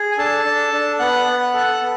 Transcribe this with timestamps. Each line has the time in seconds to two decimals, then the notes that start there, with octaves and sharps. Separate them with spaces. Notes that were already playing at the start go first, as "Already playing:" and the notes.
Already playing: G#4
0.12 G#5
0.18 D4 A4 A5
0.45 D4
0.73 D4
0.99 B3 F#5 F#6
1.28 B3
1.54 A4
1.82 B3